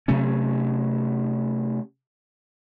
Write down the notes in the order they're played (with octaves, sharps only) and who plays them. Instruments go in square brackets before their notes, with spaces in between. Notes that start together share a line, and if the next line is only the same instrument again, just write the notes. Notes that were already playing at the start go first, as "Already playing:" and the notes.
[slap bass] C3 F#3 A3 C#4